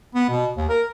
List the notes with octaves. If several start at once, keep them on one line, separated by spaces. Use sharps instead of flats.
B3
B2
D#2
A#4